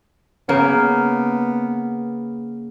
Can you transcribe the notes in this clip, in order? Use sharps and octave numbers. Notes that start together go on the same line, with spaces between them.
C#3 A#3 B3